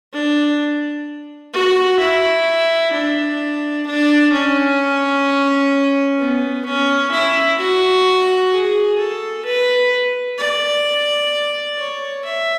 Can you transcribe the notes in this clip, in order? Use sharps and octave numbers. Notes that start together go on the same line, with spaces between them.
D4
F#4
E4
D4
D4
C#4
B3
C#4
E4
F#4
G#4
A4
B4
D5
C#5
E5